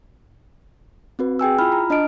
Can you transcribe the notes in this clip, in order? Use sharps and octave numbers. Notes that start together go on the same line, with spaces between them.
C4 F#4 B4
G#4 G5 G#5 E6
E4 F4 B5 F6
A#5
D4 D#5 A5 F6 D7